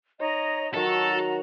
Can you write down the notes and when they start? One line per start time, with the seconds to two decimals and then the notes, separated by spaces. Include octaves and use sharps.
0.20 D#4 C#5 D#5 A#5
0.74 D#3 F#3 F#4 A4 A#5